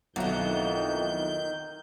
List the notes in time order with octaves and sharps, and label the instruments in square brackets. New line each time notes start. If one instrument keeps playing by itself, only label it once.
[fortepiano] B1 F#4 [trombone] F2 [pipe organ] D#3 G6 [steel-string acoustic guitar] E3 A#3